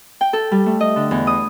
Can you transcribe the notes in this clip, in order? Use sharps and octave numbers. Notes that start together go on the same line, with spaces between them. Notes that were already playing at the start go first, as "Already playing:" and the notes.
G5
A4
G3
A3
D#5
D3
E2
D#6